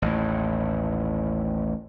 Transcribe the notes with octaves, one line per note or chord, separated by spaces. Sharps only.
A1 D#2 A2